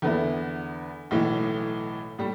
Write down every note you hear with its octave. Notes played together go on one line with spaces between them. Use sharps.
E2 D3 B3 E4
B1 A2 E3 A3
A2 G3